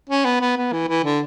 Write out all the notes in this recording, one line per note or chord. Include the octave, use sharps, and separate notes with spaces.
C#4
B3
B3
B3
E3
E3
D3